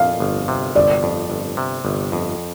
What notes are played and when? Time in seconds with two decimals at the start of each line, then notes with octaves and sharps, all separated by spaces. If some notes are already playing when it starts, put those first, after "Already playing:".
Already playing: F2 F5
0.20 G1
0.48 C3
0.75 G1 D5
1.03 F2
1.30 G1
1.57 C3
1.85 G1
2.12 F2